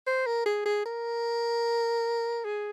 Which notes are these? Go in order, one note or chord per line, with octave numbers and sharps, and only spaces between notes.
C5
A#4
G#4
G#4
A#4
G#4